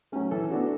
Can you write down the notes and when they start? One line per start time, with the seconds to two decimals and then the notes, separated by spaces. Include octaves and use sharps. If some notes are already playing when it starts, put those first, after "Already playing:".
0.12 F#3 A3 C#4
0.31 E3 A4
0.51 B3 D4 F#4